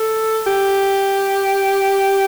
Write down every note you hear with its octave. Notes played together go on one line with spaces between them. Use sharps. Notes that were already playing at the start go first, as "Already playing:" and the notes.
Already playing: A4
G4